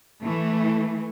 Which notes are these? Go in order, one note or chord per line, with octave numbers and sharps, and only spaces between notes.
E3 A3